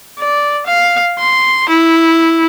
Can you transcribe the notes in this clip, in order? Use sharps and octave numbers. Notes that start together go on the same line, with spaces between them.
D5
F5
C6
E4